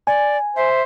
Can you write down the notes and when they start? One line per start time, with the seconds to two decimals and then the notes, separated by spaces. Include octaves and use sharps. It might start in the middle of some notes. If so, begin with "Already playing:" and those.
0.07 D5 G#5
0.56 C5 E5